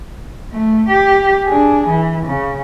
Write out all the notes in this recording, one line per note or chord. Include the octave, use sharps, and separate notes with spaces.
A3
G4
D4 G#4
E3
C#3